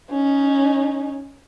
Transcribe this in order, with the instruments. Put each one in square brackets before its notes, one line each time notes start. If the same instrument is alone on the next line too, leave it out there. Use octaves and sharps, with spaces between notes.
[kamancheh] C#4 D#4